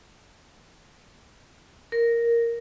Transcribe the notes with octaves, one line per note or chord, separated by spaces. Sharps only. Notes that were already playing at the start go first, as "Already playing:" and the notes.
A#4